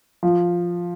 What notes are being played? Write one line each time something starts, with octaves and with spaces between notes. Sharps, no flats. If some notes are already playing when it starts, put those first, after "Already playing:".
F3